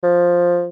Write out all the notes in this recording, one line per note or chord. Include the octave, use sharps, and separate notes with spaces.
F3